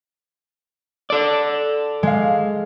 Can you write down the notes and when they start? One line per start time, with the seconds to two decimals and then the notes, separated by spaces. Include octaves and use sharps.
1.10 A4 D5
2.03 G#3 F5